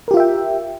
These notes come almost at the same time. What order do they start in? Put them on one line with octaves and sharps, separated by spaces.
A#4 G4 F4 E5 G5